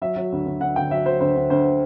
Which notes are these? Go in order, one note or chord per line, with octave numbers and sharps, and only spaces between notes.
F#3 E5
F#3
D2
D2
D2 F#5
D3 G5
F#3 E5
F#3 C5
D2 C5
D2
D2 C5